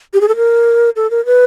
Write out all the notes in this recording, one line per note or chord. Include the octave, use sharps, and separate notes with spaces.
G4
G#4
A4
A#4
A4
A#4
B4